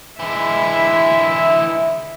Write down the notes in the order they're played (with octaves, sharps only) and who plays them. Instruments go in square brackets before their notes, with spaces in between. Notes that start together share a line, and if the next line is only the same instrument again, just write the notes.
[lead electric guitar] D3 E3 [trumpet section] G#3 E4 [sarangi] E5